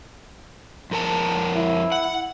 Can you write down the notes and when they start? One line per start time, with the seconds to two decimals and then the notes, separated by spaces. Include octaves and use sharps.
0.91 F2 A#4 A5
1.56 E4
1.92 F#5